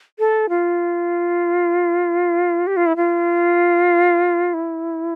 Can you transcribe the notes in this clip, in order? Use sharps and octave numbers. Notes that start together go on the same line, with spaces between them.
A4
F4
G4
F4
E4
F4
E4